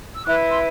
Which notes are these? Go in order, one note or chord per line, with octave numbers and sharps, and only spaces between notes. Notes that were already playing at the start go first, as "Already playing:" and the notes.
E6
E4 B4 D6 F#6
C6 E6